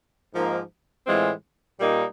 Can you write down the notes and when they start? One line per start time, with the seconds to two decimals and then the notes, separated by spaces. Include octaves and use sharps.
0.34 G#2 F3 A#3 D#4
1.07 A2 E3 G#3 C4 F4
1.79 A#2 G3 A#3 D#4